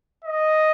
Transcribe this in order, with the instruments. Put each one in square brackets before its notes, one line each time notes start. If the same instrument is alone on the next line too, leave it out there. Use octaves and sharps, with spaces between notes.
[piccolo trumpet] D#5